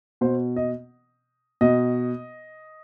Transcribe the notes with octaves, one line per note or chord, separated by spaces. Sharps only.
B2 C5
D#5
B2 D#5